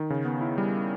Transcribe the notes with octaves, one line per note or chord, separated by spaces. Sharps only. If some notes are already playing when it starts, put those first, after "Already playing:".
Already playing: D#3
C#3
B3
E4
G3
E4